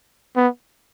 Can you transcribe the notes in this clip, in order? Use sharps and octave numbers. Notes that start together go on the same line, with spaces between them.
B3